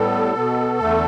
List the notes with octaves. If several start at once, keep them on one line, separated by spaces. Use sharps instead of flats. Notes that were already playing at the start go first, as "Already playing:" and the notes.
Already playing: A2 G3 B3 A4
B2 B3
E2 D3 A3